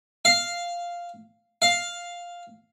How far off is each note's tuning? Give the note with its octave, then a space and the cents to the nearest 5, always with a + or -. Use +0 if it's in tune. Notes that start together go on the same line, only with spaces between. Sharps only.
F5 -5
F5 +0